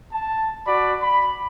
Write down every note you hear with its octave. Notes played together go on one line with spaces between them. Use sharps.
A5
F#4 D5 B5
B5